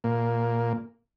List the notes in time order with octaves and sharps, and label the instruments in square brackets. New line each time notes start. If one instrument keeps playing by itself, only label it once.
[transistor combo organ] A#2 A#3